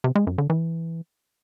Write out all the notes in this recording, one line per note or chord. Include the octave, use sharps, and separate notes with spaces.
C3
G#3
F#2
D3
E3